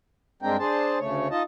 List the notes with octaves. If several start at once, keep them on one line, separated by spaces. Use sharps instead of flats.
G2 G#3 C4 D4 A#4 G5
D4 G#4 C5 A5
D2 C#3 A3 C#5
D#4 F4 D#5 A5